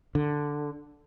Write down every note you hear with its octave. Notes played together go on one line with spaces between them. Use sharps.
D3